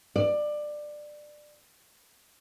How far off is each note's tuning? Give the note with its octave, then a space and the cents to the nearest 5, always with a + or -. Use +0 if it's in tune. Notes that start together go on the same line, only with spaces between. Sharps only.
D5 +20